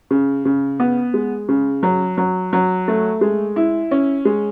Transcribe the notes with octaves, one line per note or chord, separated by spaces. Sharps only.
C#3
C#3
B3
G#3
C#3
F#3
F#3
F#3
A3
G#3
E4
C#4
G#3